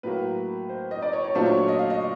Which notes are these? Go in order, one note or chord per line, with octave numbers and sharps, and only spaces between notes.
A2 F#3 A#3 B4
C5
D#5
D5
C#5
C#5
A#2 F#3 A3 D4 F4 C5
C#5
C#5
D#5
F5
D#5